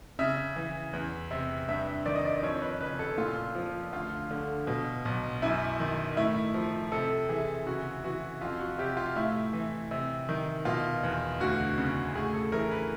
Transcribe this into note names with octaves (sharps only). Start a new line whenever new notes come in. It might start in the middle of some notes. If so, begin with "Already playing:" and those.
C#3 E5
E3
E2
C3
G2 E5
D#3 D5
D#5
D5
F2 C#5
B4
C#3 B4
A4
A#2 F4
F3
D2 F4
D3
B2
B1
F#2 E4
D#3
A2 E4
F3
C3 A4
E3 G#4
C#3 F#4
E3 F#4
F2 F4
F#4
C3 G4
F4
A2 E4
E3
C3
D#3
B2 F4
E2
D2 F#4
C#3
A2 G#4
A4
E3 A#4
B4